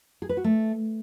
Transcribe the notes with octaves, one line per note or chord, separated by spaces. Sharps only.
G#4
B4
F#4
A3